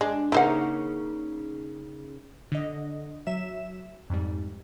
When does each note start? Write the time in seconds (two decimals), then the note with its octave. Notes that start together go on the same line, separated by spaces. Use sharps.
0.01 G#3 D4
0.32 C#3 A#3 D#4 E4 C5 F#5
2.52 D3 D#5
3.27 F#3 E5 E7
4.10 F2 G#2 G3